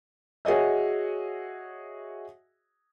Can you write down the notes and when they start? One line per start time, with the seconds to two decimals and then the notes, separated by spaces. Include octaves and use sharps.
0.45 F#4 G#4 C#5 D#5 E5